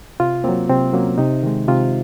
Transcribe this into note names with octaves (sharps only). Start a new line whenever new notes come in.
C3 F4
F#3 A#3 C4
C3 C4
F#3 A#3 C#4
C3 D#4
D#3 G#3
C3 F4